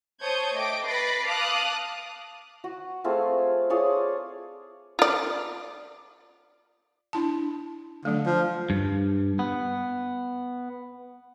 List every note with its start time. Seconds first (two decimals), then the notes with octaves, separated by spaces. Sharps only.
0.22 C5 C#5 A5 D#6 G6 G#6
0.54 A3 D#5 G5 D6 D7
0.84 B4 B5 A6 A#6 C7 D7
1.25 F5 A5 D6 D#6 F6 F#6
2.64 F#4
3.04 A3 C4 F4 G#4
3.70 F4 G#4 C#5 D5
4.99 F4 D5
7.13 D4 E4 A5
8.05 D3 F#3 A3
8.26 F3
8.70 G2
9.39 B3